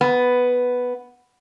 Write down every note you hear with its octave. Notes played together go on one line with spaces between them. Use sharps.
B3